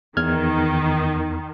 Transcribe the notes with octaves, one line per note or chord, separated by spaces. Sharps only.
E2 D#3 F6 G#6